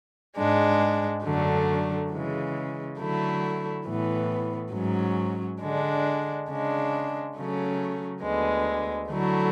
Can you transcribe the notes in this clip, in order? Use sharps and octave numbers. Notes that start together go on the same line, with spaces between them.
G#2 G#3 D4
F#2 D3 F#3 A3 D4
C#3 E3 G#3
D3 F#3 A3 E4
A2 E3 B3
G#2 F#3 C#4
D3 G#3 D4
C#3 G#3 D4
C#3 F#3 A3 C#4
D2 D3 G#3 B3
D3 F#3 A3 E4